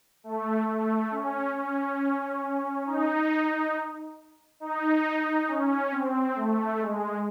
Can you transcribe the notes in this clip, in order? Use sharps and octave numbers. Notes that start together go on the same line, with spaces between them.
A3
A3
C#4
C#4
D#4
D#4
C#4
C4
A3
G#3